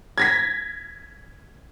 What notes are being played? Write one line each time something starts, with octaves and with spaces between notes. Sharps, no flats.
G#6 A#6 B6